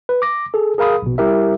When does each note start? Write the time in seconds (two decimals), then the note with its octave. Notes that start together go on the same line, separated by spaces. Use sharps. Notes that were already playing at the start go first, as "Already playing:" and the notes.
0.09 B4
0.22 D6 A#6
0.54 G#4 A4
0.78 G#4 A#4 F5 B5 D#6
1.02 A#1 B2
1.18 G3 E4 G4 A#4 E5